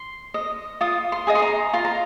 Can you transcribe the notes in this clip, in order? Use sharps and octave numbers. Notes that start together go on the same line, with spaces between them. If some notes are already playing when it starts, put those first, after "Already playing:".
Already playing: C6
D#5
F4 D#6
C6
G#4 D#5 D#6
C6
A#5
F4 C6
A#5